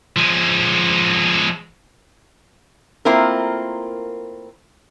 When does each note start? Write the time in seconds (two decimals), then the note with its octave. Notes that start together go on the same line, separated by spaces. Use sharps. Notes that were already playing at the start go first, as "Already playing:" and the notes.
0.17 F3 G#3
3.05 A3 A#3 C4 E4 F4 A#4